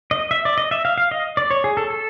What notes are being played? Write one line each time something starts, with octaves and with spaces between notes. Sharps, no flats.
D#5
E5
D5
D#5
E5
F5
F5
D#5
D5
C#5
G#4
A4
A4